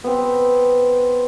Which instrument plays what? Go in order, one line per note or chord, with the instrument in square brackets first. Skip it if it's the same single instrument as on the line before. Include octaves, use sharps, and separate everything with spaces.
[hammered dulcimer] B3 C4